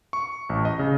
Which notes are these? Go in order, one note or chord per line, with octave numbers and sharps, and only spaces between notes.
C#6
A1
D#5
C#3